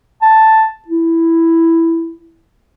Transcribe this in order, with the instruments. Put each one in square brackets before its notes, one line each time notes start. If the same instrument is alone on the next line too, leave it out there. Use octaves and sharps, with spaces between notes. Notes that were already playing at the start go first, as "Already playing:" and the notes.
[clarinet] A5
E4